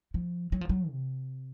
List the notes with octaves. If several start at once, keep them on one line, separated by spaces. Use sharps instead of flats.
F3
F#3
F3
F#3
C3